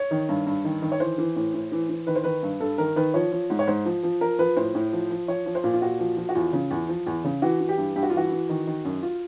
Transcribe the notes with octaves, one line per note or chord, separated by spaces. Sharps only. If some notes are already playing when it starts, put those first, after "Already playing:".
Already playing: C#5
D#3
G2
G2
D#3
D#3
C#5
E3 C5
E3
A2
A2
E3
E3
D#3 B4
C5
D#3 B4
G2
G2 A4
D#3 A#4
D#3 B4
F3 C#5
F3
G#2
C#5
G#2 C5
F3
F3
F3 A#4
F3 B4
A2 C5
A2
F3
F3
F3 C#5
F3
C5
A#2
F4
A#2 F#4
F3
F3
F#4
E2 F4
C#3
E2
F3
E2
C#3
E3 F#4
E3
G4
G2
G2 G4
F#4
F4
E3 F#4
E3
D#3
D#3
F#2
F4